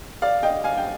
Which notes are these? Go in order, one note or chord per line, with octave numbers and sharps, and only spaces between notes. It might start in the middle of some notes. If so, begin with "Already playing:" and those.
D5 F5
D#5 G5
F5 G#5
G5